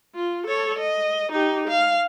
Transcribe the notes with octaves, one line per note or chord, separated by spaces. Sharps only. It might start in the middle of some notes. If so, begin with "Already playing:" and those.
F4
A4 C#5
D#5
D#4 G4
F5